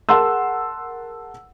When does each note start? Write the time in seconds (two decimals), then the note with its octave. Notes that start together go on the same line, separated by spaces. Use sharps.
0.09 G#4 A#4 F#5 A5 C6 E6